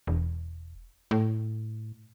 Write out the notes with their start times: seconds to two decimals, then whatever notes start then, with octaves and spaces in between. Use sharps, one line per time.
0.07 E1
1.11 A2